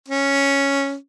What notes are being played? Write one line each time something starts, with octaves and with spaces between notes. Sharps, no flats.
C#4